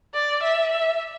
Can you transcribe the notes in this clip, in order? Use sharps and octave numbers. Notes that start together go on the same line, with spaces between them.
D5
E5
E5